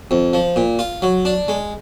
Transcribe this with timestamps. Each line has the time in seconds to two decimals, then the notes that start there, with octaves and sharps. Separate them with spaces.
0.11 F2
0.33 F3
0.56 A#2
0.79 F4
1.02 F#3
1.25 D4
1.48 G#3